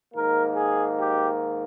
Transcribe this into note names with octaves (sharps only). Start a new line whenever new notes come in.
G#2 D#3 A#3 A#4
G#4
G4